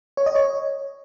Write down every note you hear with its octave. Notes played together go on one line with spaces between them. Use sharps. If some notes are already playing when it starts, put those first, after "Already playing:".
C#5
D#5
C#5